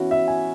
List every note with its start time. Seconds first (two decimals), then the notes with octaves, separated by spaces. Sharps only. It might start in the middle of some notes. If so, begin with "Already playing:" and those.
Already playing: E3 B3 C#4 E4 F#4
0.11 E5
0.28 G#5